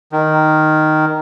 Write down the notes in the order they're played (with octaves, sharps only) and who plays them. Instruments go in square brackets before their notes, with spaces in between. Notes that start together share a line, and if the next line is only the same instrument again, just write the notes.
[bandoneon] D#3